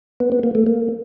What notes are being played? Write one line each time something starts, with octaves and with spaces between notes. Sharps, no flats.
B3
B3
A#3
A3
A#3